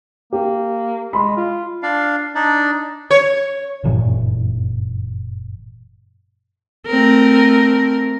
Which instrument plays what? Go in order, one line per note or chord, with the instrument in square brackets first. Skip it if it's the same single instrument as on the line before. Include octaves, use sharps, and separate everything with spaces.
[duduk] A#3 [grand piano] G4
[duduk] G#3 [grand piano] B5 C6
[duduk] F4
[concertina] D4 D5 F5
D4 D#4 D5
[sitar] C#5
[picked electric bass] F#1 G2 A#2 E3
[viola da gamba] A3 C4 A#4